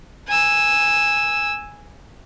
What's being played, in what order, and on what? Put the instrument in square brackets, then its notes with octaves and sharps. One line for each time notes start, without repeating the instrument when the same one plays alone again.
[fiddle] G#5 E6